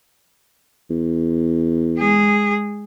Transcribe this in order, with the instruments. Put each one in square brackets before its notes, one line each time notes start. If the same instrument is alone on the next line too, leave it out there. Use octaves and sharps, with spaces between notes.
[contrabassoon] E2
[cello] G#3 G#4